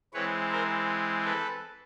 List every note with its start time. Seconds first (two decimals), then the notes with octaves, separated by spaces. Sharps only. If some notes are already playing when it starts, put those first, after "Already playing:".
0.14 E3 G#3 C4 B4 C#5
0.52 A#4 C5
1.25 A4 B4